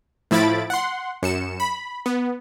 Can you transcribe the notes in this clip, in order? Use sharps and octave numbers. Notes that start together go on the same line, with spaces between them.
A2 F3 E4 B5 A6 D7
F#5 C6
F#2 C#7 E7
B5
B3